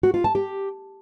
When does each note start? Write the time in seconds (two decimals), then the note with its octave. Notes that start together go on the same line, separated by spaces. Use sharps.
0.03 F#4
0.14 F4
0.24 A5
0.35 G4